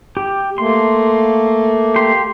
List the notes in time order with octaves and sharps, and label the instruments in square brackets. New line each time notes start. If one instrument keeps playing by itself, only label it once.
[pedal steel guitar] G4
[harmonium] A3 A#3 [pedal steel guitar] C6
[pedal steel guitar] G4 C6